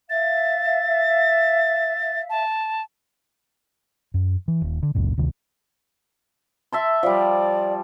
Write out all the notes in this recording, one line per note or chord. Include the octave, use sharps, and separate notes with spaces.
E5 F5 A6
A5
F#2
E3
D#1
D3
G1 C#2 F#2 A#2
D2 C3 D#3
E5 A5 C6
F3 G3 D5